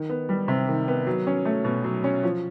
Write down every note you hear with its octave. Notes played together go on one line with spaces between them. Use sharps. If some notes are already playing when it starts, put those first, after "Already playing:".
Already playing: D#3
B3
G3
C3
D#3
B3
F#3
C#4
A3
B2
F#3
C#4
F3